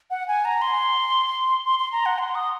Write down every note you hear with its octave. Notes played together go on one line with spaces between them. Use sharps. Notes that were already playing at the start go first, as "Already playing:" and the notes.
F#5
G#5
A#5
C6
C6
C6
A#5
F#5
C6
D#6